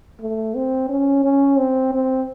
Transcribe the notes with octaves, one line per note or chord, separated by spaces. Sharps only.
A3
C4
C#4
C#4
C4
C4